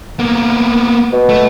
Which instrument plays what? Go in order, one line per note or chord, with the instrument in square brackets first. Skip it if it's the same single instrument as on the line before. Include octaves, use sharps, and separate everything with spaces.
[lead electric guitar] A#3 B3
[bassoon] B2
[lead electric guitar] A3